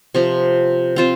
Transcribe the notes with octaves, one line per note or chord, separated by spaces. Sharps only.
C3 F3 C4
C4 F4 C5